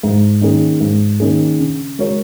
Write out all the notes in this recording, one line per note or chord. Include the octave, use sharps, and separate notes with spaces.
G#2
D#3 A#3 C#4 G#4
G#2
D#3 A#3 C#4 G#4
C#3
G#3 F#4 A#4 C#5